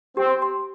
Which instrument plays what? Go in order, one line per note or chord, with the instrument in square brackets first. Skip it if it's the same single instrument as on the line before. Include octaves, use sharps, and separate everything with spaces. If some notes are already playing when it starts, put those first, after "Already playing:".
[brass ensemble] C4 [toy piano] G4
[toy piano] C6